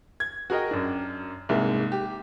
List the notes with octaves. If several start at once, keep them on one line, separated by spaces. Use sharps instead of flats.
G#6
F#4 G#4 A#4 D#5 G5
F#2 D4
C2 G#2 G#3 A#3
G4